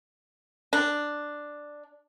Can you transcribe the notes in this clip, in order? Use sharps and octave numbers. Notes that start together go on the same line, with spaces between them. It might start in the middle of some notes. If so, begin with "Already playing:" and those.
D4